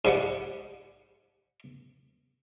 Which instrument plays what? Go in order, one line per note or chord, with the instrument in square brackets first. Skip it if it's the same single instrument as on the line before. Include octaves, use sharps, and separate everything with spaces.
[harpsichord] G#2 G3 F#5